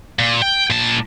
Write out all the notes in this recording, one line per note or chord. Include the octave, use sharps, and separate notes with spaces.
A#2
G5
A#2 A5